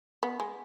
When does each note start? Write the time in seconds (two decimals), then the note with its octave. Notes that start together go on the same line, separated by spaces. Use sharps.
0.23 B3
0.40 G#3